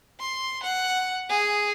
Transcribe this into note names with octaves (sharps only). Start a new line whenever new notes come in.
C6
F#5
G#4